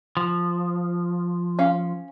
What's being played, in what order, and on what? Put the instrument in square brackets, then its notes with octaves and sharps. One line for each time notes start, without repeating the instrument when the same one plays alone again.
[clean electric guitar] F3
[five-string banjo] C#4 F5